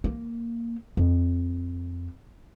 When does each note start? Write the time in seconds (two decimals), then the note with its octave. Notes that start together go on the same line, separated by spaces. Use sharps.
0.04 A#3
0.97 F2